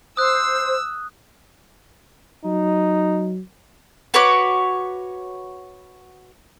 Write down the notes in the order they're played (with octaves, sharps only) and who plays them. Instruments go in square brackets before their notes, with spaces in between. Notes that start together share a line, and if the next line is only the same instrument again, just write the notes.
[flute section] C5 [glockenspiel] D#6 F#6 [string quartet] E6
[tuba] F#3 [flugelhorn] D#4
[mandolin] F#4 B4 C#5 D6